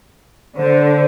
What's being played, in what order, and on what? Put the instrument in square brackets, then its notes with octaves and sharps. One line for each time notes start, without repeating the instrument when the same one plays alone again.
[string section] D3 [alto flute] C5